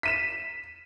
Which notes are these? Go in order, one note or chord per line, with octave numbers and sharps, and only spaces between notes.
B6 D#7 E7